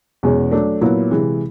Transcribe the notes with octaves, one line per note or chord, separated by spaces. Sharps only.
E2 B2 G#3 C#4
F#3 A3 D4
A#2 F#3 B3 E4
C3 E3 G#3